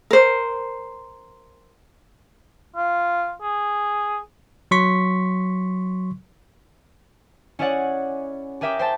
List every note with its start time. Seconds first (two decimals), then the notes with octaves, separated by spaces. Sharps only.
0.11 A#4 C5
2.76 F4
3.42 G#4
4.71 F#3 C6 C#6 B6
7.59 C#4 E4 G#4 C#5 D5 F#5
8.61 G4 G#4 A#4 E5 G5 D6
8.79 C5 G5 A5